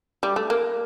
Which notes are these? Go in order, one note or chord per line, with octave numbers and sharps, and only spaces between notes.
G3
A3
A#3